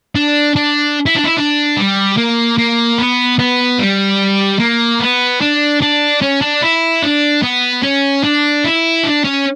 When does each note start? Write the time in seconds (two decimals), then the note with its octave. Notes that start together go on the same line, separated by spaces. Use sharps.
0.15 D4
0.56 D4
1.06 E4
1.16 D4
1.24 E4
1.37 D4
1.76 G3
2.17 A#3
2.58 A#3
2.98 B3
3.39 B3
3.79 G3
4.60 A#3
5.00 B3
5.41 D4
5.82 D4
6.22 C#4
6.42 D4
6.62 E4
7.02 D4
7.42 B3
7.83 C#4
8.24 D4
8.64 E4
9.04 D4
9.24 C#4